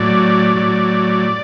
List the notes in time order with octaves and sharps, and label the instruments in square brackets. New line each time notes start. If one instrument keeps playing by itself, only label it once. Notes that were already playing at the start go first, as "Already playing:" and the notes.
Already playing: [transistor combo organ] A2 F#3 D5
A2 F#3